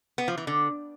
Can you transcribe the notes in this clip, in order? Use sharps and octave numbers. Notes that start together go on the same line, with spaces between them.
B3
F3
E3
D3